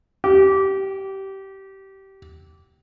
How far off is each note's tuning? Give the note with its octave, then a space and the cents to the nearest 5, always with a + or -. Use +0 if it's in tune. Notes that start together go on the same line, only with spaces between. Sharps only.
G4 -20